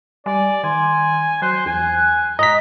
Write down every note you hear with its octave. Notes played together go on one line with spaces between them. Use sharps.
G3 D5 G#5
D#3 G#5 C6
F#3 C5 F#6
E2 G#5
G#2 D#5 A#5 B6